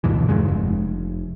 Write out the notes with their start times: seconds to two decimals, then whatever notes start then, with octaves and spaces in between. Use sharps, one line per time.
0.04 D2 G2 B2 E3
0.29 E2 G2 C#3 G#3
0.48 F1